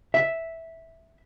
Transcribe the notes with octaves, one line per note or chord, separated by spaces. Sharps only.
E5